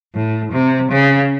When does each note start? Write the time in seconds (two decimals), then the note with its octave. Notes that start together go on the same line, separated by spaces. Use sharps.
0.14 A2
0.52 C3
0.91 C#3